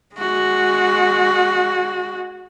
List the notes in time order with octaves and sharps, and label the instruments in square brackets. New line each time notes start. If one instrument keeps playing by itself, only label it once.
[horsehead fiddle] G#3 F#4